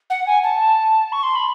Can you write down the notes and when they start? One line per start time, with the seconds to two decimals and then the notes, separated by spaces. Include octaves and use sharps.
0.10 F#5
0.26 G#5
0.43 A5
1.12 C#6
1.23 C6
1.35 B5